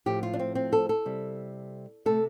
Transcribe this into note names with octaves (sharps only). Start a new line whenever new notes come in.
A2 F3 A3 G4
F4
D4
C4
C4
A4
A4
C3 G3
C3 A3 A4